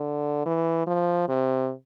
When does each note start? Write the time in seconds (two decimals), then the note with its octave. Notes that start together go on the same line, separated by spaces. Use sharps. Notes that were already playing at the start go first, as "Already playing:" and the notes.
Already playing: D3
0.46 E3
0.87 F3
1.28 C3